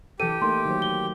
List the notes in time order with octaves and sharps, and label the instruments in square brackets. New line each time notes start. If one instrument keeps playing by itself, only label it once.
[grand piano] E3 A4 [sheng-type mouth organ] G4 [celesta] D#7
[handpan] A3 A#3 D#4 [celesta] C6
[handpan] D#3 F#3 C5
[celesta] G7